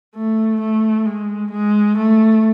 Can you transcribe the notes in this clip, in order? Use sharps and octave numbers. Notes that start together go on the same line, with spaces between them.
A3
A3
G#3
G#3
A3